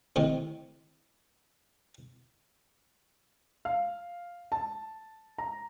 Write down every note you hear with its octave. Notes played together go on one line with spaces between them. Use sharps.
A2 C3 D#3
F5
A5
A#5